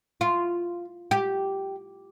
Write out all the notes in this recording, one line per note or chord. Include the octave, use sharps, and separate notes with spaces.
F4
G4